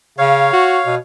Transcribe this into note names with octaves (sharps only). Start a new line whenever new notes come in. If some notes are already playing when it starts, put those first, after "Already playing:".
C#3 C#5 F5
F#4
B2